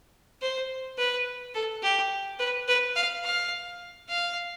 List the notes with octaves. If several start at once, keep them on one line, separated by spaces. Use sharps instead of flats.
C5
B4
A4
G4
B4
B4
F5
F5
F5